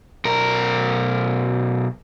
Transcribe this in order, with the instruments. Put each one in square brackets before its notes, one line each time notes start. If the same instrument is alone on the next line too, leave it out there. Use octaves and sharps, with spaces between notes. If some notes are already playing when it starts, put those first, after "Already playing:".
[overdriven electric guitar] B1 A#4